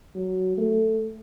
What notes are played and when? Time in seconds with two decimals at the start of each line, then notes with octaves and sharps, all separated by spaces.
0.15 F#3
0.57 A3